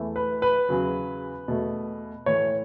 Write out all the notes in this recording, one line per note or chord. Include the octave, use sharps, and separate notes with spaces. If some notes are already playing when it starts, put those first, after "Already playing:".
Already playing: E2 E3 A3
B4
B4
E2 C#3 F#3
E2 B2 A3
A2 E3 A3 C#5